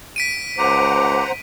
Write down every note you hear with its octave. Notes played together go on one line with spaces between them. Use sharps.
B6 D7 D#7
C#2 C5 F#5 A#5 D6